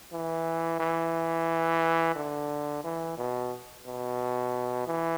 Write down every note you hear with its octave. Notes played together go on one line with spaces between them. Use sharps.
E3
E3
D3
E3
B2
B2
E3